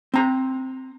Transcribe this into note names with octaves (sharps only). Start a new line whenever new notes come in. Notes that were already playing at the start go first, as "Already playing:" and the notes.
C4 A#5